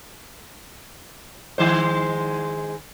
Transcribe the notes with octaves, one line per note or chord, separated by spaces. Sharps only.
D#3 G#3 C5